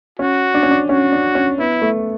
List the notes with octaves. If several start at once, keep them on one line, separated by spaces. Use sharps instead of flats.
C#4 F#4
D4
C#4
D4
C#4 F#4
D4
C#4
B3 E4
A3